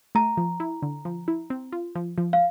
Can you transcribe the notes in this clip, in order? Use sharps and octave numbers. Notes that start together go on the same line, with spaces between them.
A3 A#5
F3
E4
D3
F3
E4
C4
F4
F3
F3
F5